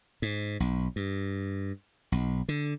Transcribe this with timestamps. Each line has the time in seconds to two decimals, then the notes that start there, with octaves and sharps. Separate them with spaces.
0.22 G#2
0.60 B1
0.96 G2
2.12 B1
2.49 D3